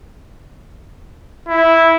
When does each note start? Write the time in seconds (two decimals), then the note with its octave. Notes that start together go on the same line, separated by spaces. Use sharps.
1.48 E4